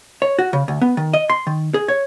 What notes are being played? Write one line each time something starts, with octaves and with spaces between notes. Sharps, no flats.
C#5
F#4
C#3
D2
B3
D#3
D#5
C6
D#3
G#4
C#5